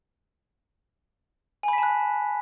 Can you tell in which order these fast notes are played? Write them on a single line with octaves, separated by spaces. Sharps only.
G#5 B5 B6 A5 F#6